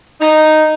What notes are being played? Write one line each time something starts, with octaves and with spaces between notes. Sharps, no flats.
D#4